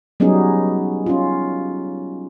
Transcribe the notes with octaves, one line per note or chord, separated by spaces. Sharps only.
F#3 G3 B3 C#4 D#4 G#4
C#4 F4